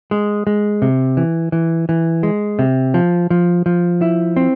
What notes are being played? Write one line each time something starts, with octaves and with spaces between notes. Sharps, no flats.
G#3
G#3
C3
E3
E3
E3
G#3
C3
F3
F3
F3
E4
C4